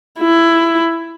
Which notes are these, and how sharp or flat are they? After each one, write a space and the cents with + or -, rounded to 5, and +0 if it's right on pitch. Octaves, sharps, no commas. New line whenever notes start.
E4 +15